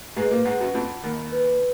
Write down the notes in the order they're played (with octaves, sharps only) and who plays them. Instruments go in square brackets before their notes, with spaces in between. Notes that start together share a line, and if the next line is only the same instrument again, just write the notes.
[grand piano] G#2 G#3 [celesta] B4
[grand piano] A#2 A#3
[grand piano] G#2 G#3 [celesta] F#5
[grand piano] F#2 F#3
[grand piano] F2 F3 [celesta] B5
[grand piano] D#2 D#3 [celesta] B5
[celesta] B4